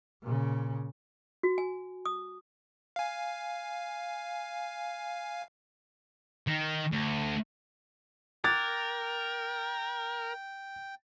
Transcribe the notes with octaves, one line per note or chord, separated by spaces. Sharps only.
A#2 C#3
F#4
G#5
D#6
F5 G#5
D#3
D2
A#4 G5 D6 F#6 G#6 A6